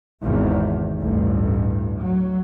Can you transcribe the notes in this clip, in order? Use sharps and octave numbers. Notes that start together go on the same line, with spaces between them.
G#1 E2 C3 D#3
A1 D2 G2
F#3